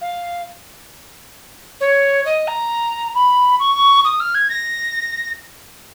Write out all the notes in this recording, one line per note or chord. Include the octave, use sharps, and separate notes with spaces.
F5
C#5
D#5
A#5
B5
C#6
D#6
F6
G#6
A#6